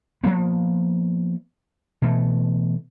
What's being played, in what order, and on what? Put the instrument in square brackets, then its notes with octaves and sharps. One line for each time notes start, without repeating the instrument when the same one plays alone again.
[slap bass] F3 F#3 A#3 B3
B2 E3 A3